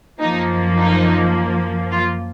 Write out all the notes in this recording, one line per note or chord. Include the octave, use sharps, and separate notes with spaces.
F#2 F3 A#3 D#4
D#4
F4